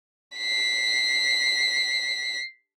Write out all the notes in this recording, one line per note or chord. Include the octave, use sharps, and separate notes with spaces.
B6 C7